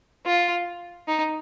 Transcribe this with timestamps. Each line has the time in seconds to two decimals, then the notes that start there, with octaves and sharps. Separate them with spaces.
0.26 F4
1.08 D#4